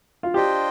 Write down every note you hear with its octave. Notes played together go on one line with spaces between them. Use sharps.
F4
D4 F4 G4 C5 D#5 G5